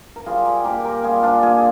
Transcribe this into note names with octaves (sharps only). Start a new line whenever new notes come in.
A#4
G3 F4 G#4
G4 A#4
A#2 G4 A#4
G4 A#4
G3 F4 G#4
D4 F4
A#2 F4 G#4